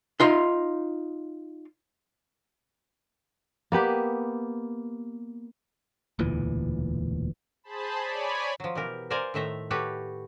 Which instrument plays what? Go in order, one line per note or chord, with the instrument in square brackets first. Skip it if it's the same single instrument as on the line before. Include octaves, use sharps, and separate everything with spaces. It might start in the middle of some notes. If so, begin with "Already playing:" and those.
[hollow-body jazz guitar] D#4 F4 C6
[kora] A#3 B3 G4 B4
[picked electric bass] E1 D2 A#2 E3
[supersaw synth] G#4 C5 A5 B5
C#5 D5 G#5 B5
[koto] F3 F#3
B2 E3 G4 A#4
A#4 C5 D5 F5 G#5 A#5
A2 D#3 A3 E5 A#5
F#4 G4 A4 B4 C#5